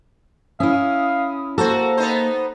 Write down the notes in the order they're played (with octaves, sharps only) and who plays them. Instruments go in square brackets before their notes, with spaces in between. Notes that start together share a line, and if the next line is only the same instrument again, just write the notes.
[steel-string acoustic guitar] C#4 E4 [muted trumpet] F5 [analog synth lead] D#6
[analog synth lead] A#3 [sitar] F#4 C5 [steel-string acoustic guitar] A4 [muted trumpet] A#5
[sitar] B3 D#4 C5